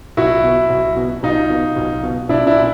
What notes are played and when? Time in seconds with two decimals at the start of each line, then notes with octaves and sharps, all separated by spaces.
0.17 B1 E4 F#4
0.43 B2
0.70 B1
0.97 B2
1.23 B1 D#4 F4
1.50 B2
1.76 B1
2.03 B2
2.29 B1 D4 E4
2.47 D4 E4
2.56 A#2